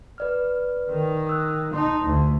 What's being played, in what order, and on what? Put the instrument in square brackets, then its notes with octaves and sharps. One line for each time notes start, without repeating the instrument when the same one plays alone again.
[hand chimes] B4 D5 F6
[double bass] D#3
[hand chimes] D#6 E6 F#6
[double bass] D#4 [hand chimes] A5 C6
[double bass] D2